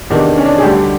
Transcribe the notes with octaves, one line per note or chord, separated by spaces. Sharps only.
E2 C3 D#3 D4
C#4
D4
G#4
D2 D3 G3 G4